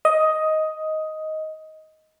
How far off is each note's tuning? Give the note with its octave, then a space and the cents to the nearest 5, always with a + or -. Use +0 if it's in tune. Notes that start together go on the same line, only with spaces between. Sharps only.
D#5 +10